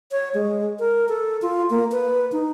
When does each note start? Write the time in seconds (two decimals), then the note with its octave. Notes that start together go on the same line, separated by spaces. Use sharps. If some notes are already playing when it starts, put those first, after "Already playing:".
0.12 C#5
0.34 G#3
0.79 A#4
1.09 A4
1.42 F4
1.70 A#3
1.92 B4
2.32 D#4